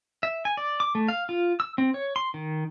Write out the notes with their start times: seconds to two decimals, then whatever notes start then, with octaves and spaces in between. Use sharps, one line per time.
0.23 E5
0.45 G#5
0.57 D5
0.80 D6
0.95 A3
1.08 F5
1.29 F4
1.60 E6
1.78 C4
1.94 C#5
2.16 C6
2.34 D#3